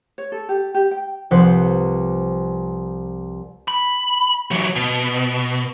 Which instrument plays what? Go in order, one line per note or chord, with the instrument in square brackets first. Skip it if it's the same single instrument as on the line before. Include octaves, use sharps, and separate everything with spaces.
[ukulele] C#5
A4
G4
G4
G5
[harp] C2 F3 B4 C5 F#5
[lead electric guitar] B5
E3 F#3
B2